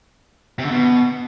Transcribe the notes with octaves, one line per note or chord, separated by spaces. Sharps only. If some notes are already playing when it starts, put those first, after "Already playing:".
C3
D3
B2